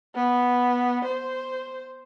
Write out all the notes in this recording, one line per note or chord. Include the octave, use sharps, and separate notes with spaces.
B3
C5